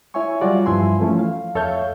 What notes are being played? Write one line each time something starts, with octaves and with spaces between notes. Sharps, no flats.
E4 C#5 E5 G#5 C#6
F#3 G3 F4 F#4 D5
G2 F3 E4 E5 G#5 C6
E3 F3 A3 C#4 E4
F5
F2 A4 C#5 E5 F5 G6